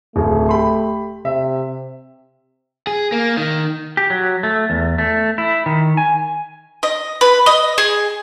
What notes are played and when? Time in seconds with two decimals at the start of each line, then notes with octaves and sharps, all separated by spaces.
0.16 D1 C#3 A3
0.49 G4 B5 C6
1.25 C3 E5
2.87 G#4
3.12 A#3
3.37 D#3
3.97 G4
4.10 F#3
4.43 A3
4.70 E2
4.98 A3
5.38 E4
5.66 D#3
5.97 G#5
6.83 D#5
7.21 B4
7.46 D#5
7.78 G#4